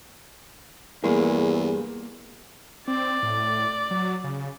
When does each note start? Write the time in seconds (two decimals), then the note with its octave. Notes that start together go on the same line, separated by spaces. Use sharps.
1.04 E2 G2 G3 A#3 G#4
2.88 C4 D5
3.23 A2
3.91 F#3
4.24 C#3